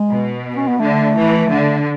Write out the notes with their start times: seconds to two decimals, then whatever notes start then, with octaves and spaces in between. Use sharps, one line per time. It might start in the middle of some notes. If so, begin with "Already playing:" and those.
Already playing: G#3
0.09 B2
0.56 C#4
0.68 B3
0.79 D3 A3
1.15 E3
1.49 D3